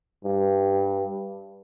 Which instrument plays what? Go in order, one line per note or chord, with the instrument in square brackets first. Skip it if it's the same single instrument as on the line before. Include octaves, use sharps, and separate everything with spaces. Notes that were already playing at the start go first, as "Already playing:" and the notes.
[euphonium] G2